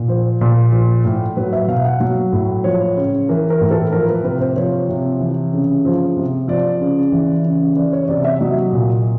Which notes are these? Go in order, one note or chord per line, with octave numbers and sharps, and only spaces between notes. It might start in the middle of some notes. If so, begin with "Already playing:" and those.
Already playing: A#2
F3 C5
A#2
F3
A2
F#3 B4
E5
B2 F5
F#5
F#3
A2
F3 C#5
C#3
E3 A#4
A#4
A2
A4
F3 A#4
B4
C3 B4
C5
F3 C#5
C3
E3
C#3
F3
C3
F3 D5
C#3
E3
C#3
E3 D5
C#5
C3 D5
E5
F#3 D#5
A#2